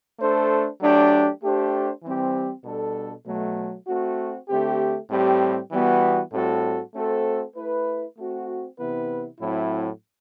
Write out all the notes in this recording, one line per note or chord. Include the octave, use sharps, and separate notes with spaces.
A3 D4 A4 C5
F#3 A3 D4 G4
A3 D4 G4 C5
E3 G3 C4 G4
B2 G3 D4 A4
B2 F#3 A3
A3 C4 F#4
D3 A3 C4 G4
A2 G3 C4 G4
E3 G3 B3 F#4
A2 G3 C4 F#4 A4
A3 C4 F#4 A4 C5
A3 E4 B4
A3 C4 F#4
C3 E3 B3 E4 B4
A2 F#3 C4 E4